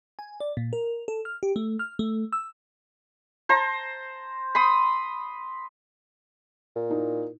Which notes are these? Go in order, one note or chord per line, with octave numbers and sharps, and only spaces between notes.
G#5
D5
A#2
A#4
A4
F6
G4
A3
F6
A3
E6
C5 A5 A#5
B5 C6 D#6
A#2
D#4 E4